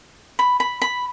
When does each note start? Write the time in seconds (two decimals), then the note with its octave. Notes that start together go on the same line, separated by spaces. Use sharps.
0.39 B5
0.60 B5
0.82 B5